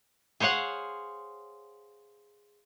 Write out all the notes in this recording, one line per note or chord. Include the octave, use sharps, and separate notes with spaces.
G#4 C5 C#5 F5 F#5